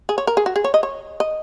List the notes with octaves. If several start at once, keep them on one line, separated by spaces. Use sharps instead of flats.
G#4
C#5
A#4
G#4
F#4
G#4
C#5
D#5
C#5
D#5